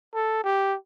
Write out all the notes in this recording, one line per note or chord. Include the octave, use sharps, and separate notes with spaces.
A4
G4